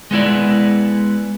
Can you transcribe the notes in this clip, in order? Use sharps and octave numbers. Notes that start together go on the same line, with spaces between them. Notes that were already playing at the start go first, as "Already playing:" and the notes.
G#3 B3 E4 D5